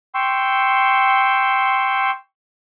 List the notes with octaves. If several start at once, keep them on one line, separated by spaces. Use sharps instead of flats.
G5 C6 C#6 E6